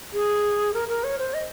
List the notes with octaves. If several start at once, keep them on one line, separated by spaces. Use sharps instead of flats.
G#4
A#4
A#4
C#5
C5
D#5